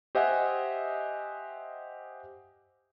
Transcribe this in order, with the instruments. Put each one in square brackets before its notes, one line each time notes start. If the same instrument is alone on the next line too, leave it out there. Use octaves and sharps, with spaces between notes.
[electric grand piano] G4 C5 D#5 E5 F#5 G#5